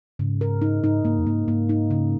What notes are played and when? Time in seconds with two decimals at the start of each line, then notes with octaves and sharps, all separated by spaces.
0.19 G#2 C#3
0.41 A#4
0.62 D#4
0.84 G#2 D#4
1.05 G#2 A#3
1.19 F2
1.26 G#2 A#3
1.47 G#2 A#3
1.69 D#4
1.91 C#3